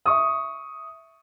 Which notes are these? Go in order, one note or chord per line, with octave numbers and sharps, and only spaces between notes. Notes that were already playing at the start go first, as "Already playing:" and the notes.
E5 C#6 D#6